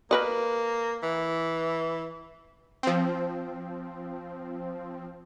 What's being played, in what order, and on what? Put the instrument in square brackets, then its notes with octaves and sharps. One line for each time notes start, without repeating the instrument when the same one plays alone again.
[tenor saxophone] A#3 [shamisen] A#4 B4 D#5
[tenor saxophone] E3
[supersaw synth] F3 C4